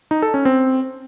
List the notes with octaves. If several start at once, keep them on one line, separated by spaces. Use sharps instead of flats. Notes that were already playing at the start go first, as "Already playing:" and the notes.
D#4
A4
C#4
C4